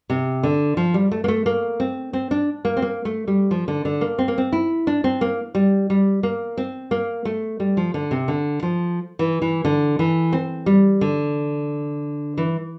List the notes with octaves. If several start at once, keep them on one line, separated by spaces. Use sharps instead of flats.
C3
D3
F3
G3
A3
A#3
A3
A#3
C4
C4
D4
A#3
C4
A#3
A3
G3
F3
D3
D3
A#3
C4
A#3
C4
E4
D4
C4
A#3
G3
G3
A#3
C4
A#3
A3
G3
F3
D3
C3
D3
F3
E3
E3
D3
E3
C4
G3
D3
E3